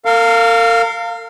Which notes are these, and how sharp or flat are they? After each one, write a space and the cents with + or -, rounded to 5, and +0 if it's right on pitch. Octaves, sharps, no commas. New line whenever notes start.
A#4 -40 F5 +0